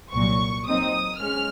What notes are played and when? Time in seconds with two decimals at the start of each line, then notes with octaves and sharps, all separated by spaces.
0.13 C2 A#2 F#3 C#6
0.67 A#2 F#3 C4 D#4 D#6
1.20 G#3 C#4 F6